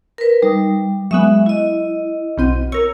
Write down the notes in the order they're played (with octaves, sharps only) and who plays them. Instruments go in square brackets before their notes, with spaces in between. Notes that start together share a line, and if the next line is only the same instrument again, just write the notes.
[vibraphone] A#4 B4
[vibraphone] G3 [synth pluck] D#4
[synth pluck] F#3 G#3 B3 [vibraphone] E5
[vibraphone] E4 D#5
[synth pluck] B1 C4 D#7
[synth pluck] A#4 C#5 [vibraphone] E6